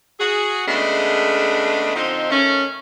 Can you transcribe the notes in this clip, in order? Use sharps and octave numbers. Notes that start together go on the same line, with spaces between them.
F#4 G#4
C#3 G#3 A3 B3 D4
D3 F3 C4 D#4
D#3 A3 C#4